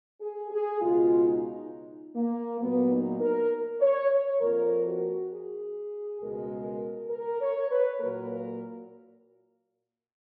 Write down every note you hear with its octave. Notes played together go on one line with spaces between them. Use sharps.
G#4
G#4
C#2 B2 G#3 F4
D#4
A#3
A#2 F#3 A#3 B3
D#4
A#4
C#5
C#5
F2 F3 A#3 A#4
F#4
G#4
C#2 B2 G#3 A#4
A#4
C#5
B4
A#2 F#3 A#3 A#4
A#4